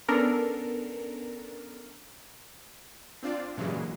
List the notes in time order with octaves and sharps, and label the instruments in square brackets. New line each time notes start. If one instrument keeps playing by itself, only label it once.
[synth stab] B3 C#4 D4 A4 A#4
[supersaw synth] C4 D4 F4 D5
G2 A#2 C#3 E3 F#3 G#3